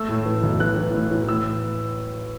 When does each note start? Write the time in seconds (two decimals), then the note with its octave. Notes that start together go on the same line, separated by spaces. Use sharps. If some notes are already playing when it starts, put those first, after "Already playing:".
Already playing: A3 E6
0.09 A2
0.26 E3
0.43 B1
0.60 E3 F#6
0.78 E3
0.95 A2
1.11 E3
1.29 A2 E6